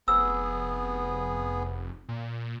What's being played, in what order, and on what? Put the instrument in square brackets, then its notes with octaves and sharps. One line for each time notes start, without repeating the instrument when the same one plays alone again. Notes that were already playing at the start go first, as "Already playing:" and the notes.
[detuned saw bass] F1 [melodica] B3 G#4 [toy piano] E6
[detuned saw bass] A#2